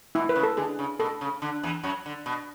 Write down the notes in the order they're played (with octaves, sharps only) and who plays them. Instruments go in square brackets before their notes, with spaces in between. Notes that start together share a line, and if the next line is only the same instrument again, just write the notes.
[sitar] B2 [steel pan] E4
[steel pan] B4
[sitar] C#3
[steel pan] A4
[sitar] D3 [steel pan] G#4
[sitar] C#3
[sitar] B2 [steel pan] A4
[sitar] C#3
D3
E2 E3
F#2 F#3
D3
B2